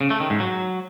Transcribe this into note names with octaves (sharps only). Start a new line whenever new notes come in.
C#3
A3
D#3
G#2
F#3